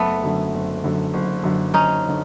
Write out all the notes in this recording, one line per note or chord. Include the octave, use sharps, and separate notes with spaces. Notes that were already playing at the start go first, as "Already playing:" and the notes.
Already playing: F#1 A3 B3
F#2 D3
F#1
F#2 D3
F#1
F#2 D3
F#1 C#4 D#4
D3